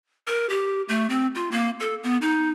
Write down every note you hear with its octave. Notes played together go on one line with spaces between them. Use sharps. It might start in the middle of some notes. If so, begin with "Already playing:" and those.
A#4
G4
A3
C4
F4
A#3
A4
B3
D#4